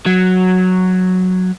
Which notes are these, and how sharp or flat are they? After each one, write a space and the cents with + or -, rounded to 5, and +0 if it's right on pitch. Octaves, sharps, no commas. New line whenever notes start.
F#3 -5